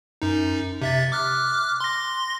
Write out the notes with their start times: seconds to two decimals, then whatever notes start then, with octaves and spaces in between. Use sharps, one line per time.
0.22 F#2 D#4
0.82 C3 E5 A6
1.12 D6 F6 F#6
1.80 C6 A#6